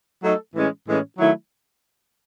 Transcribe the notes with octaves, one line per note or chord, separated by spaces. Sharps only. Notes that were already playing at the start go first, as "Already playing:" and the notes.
F#3 A3 D#4 A4
A2 E3 G#3 C#4
A2 E3 G#3 C#4
D#3 F#3 A3 E4